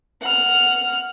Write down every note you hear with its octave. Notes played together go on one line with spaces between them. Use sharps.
F#5 F6